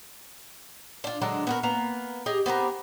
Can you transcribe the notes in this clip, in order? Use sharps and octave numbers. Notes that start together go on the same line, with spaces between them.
D4 F4
D3 F#3 G#3 D4
B3 F#4 A#4
A#3 B3 A#5
G4 G#4 D#5
B3 C4 G4 A#4